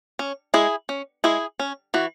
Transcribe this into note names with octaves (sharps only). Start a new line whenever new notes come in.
C#4
G#3 E4 G#4
C#4
G#3 E4 G#4
C#4
E3 F#4